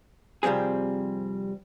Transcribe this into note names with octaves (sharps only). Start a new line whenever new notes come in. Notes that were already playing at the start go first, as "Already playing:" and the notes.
C3 F3 G3 C4 G#4